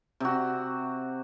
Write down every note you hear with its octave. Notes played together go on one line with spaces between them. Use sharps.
C3 F#4